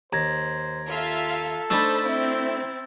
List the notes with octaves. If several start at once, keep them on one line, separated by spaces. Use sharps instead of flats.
D#2 C5 A#5 G#6 A#6
F4 A4 E5 F5
A3 D4 D#4 C5 A5 B5 E6 A6
C4 E4 E5